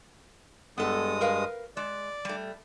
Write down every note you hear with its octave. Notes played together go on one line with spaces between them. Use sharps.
G2 G#3 B3 A4 D#6
A#4 B4 F5
G#3 D5
G3 A3